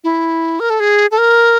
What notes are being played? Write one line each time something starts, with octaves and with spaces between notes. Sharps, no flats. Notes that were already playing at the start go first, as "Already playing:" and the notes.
E4
A#4
A4
G#4
A4
A#4